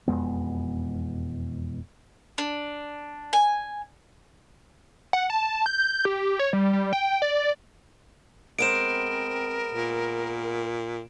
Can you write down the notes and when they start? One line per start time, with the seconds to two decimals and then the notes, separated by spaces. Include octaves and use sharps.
0.08 E1 F2 G#3 B3
2.38 D4
3.33 G#5
5.13 F#5
5.30 A5
5.66 G6
6.05 G4
6.39 C#5
6.53 G3
6.73 G3
6.93 G5
7.22 D5
8.59 G#3 B3 C4 A#4 C5 D7 E7
9.70 A#2